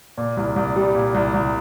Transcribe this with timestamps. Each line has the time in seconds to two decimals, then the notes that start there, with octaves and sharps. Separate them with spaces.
0.18 A#2
0.37 C2
0.56 C2
0.76 G3
0.95 A#2
1.14 C2
1.34 C2